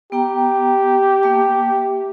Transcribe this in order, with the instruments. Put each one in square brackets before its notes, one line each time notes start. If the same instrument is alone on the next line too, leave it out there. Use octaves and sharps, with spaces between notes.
[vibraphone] B3 G5 A#5 [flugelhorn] G4
[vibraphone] A#3 E5 A5